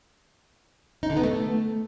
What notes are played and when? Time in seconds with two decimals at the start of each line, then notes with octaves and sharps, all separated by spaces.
1.03 D#4
1.10 D3
1.17 B3
1.24 A3